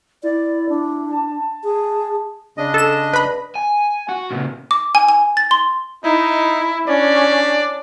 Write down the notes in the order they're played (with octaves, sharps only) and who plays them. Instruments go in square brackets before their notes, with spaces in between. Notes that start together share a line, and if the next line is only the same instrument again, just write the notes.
[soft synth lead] E4 [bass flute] D5
[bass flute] D4
[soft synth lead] A5
[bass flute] G#4
[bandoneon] C#3 D4 D#5
[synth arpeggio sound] A4 E7
B4 B5
[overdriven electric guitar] G#5
F#4
A#2 C#3
[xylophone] D6
G#5
G#5
A6
C6
[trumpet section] D#4 [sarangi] E4
[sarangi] C#4 [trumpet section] D4 D5